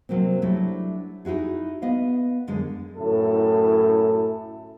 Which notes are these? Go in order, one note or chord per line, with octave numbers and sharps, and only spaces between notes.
C3 F#3 A#3 C4
F#3 G3 A3 D4 E4
D#4 E4 F#4 G#4
B3 D#5 F5
F#2 D3 G#3
F#2 A2 E4 A4